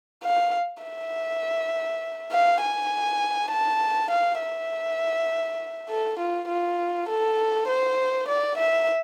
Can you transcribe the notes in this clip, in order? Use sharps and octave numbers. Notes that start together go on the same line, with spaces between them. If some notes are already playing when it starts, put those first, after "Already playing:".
F5
E5
F5
G#5
A5
F5
E5
A4
F4
F4
A4
C5
D5
E5